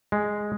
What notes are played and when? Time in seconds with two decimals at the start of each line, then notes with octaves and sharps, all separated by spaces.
0.12 G#3